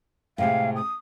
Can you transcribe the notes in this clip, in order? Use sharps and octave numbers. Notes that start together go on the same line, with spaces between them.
A2 C3 G#3 F5
D#6